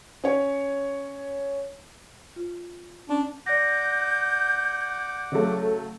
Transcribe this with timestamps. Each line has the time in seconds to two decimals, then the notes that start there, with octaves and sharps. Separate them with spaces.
0.24 C#4 C#5
2.36 F4
3.09 C#4 D4
3.46 D5 F#5 D6 G6 A#6
5.32 C#3 F#3 A3